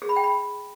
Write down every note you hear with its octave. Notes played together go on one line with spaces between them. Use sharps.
G#4
B5
G5
B5